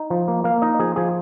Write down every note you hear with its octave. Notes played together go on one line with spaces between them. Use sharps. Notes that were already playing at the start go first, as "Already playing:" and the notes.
Already playing: D#4
F3
A#3
A#3 F5
D#4 D#5
F3 G#4
F3 G#4